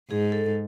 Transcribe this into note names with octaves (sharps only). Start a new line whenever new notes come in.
G#2 G#4
A4